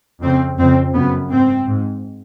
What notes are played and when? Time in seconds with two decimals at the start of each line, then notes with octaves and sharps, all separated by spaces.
0.21 F2 C#3 C4
0.58 F2 C#3 C4
0.94 F#2 C#3 B3
1.30 G#2 C4
1.66 G#2